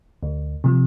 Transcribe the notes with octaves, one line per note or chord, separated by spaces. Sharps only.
D2
C3 F3